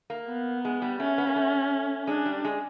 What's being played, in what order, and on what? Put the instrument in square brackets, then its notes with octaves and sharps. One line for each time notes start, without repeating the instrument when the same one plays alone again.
[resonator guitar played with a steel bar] A#3
[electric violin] B3
[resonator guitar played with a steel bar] G#3
G3
[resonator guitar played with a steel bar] A3 [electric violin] C#4
[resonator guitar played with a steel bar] B3
A#3
A3
[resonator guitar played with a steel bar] G#3 [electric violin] D4
[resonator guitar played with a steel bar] G3
G#3